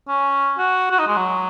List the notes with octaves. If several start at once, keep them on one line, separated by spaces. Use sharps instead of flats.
C#4
F#4
F#4
D#4
G#3
F#3